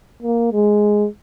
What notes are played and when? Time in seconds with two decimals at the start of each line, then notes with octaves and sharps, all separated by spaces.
0.23 A#3
0.52 G#3